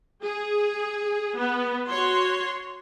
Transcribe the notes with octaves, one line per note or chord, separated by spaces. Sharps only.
G#4
B3
F#4 C#5 C6